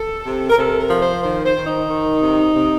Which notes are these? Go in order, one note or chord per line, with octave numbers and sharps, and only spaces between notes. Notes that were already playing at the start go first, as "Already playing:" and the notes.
Already playing: A4
C3
A#4
C3 A4
A#4
F3
C5
D#3 C5
C5
D#3
D#4
D#3
C3
C3